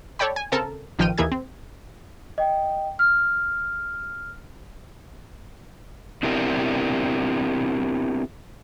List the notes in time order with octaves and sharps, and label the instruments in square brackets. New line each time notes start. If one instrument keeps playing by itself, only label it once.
[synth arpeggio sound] A4 C#5 D5 G5 B5
G#5
C#3 C4 A4 A#4 A5
A1 D#3 F3 G5 F6 D#7
D#2 E3 A#3 G#4 E5 G#6
C4
[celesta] D#5 G5
F6
[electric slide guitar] B3 C4 D4 E4 G4 A#4